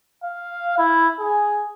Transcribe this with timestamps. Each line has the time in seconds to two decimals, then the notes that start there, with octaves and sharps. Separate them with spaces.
0.24 F5
0.78 E4
1.20 G#4